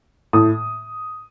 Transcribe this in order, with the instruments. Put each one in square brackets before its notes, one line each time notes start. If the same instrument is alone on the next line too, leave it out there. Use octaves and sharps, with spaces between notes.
[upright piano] A2 D#6